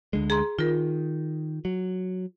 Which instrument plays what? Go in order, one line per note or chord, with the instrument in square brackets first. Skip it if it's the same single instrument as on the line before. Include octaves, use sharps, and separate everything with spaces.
[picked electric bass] D2 D3 G#3
[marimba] G#4 A#5 C6
[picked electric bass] D#3 [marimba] F4 A#4
[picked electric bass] F#3